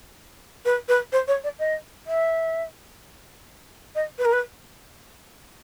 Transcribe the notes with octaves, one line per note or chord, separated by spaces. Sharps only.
B4
B4
C5
C#5
D5
D#5
E5
D#5
B4
A#4
B4